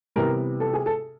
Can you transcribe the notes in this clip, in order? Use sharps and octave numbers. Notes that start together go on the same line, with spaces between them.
C3 E3 G3 B3 A#4
A4
G#4
A4